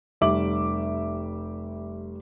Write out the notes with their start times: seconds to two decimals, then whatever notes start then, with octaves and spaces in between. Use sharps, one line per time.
0.21 F1 G3 E5 D6 F#7